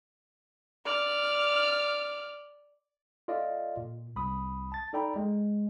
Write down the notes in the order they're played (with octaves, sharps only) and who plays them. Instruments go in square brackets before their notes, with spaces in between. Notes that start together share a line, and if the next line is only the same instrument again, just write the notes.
[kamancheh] D5 F6
[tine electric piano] F4 A4 D5 D#5 F5
A#2
C2 B5 D#6
A5 A6
D#4 A4 D5 G5 A#5 B5
G#3